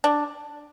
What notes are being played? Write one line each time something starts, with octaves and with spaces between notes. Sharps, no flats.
D4